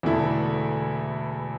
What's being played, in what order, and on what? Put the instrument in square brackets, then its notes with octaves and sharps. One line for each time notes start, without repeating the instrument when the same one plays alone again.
[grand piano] E1 E2 D3 A3 E4